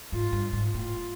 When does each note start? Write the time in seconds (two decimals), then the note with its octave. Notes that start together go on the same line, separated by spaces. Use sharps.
0.12 G#2 F4
0.32 G2
0.53 G#2
0.74 A2 F4